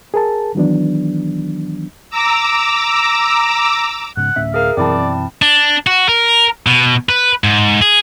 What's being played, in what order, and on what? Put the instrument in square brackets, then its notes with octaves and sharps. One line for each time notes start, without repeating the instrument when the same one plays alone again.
[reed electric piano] G#4 A#4 A5
D#3 E3 F#3 B3 D4
[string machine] A#5 D6 E6
[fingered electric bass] G#2 C#3 [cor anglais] F#5
[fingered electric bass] D2 A2 C#4 [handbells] E5
[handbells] G#4 A#4 [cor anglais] F5
[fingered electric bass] F#2 B2 E3 [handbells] C4 E4 A5 [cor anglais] D5
[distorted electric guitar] D4
F#4
A#4
B2
B4
G#2
G#4